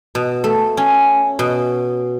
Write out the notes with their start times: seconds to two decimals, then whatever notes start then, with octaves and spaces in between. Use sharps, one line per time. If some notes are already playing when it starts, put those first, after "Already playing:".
0.15 B2
0.44 A3
0.77 C#4
1.39 B2